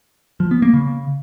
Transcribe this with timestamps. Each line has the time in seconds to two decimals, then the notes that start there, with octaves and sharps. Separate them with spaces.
0.40 F3
0.51 B3
0.62 A#3
0.74 C#3